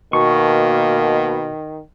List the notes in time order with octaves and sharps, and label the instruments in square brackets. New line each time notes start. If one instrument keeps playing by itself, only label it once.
[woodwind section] B2 [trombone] D#3 [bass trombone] A#3 [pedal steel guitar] C#6